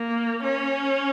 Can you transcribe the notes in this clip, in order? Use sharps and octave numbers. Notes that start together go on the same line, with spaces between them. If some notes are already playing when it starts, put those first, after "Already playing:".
Already playing: A#3
C#4